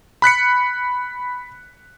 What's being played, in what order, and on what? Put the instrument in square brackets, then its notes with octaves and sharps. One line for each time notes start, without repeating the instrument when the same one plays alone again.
[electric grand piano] B5 F#6 B6 C#7